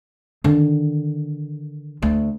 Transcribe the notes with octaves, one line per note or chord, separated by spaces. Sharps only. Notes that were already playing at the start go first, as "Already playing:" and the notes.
D3 D#3
D2